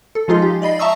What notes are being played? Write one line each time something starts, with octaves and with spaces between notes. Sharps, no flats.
A4
F3 G#3 D#4 F4 G#4 D#5
G4
D5 D#5 B5 C7
E5 A5 A#5 C#6 D#6 E6